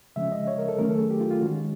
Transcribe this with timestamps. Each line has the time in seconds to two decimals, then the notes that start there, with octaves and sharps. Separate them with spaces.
0.16 C#3 F3 G#3 C#4 E5
0.32 D#5
0.47 C#5
0.58 A#4
0.68 A4
0.78 D#3 F#3 A3 C#4 A#4
0.89 A4
0.99 G#4
1.11 G4
1.21 F4
1.31 F4
1.41 D#3 G#3 C#4 F#4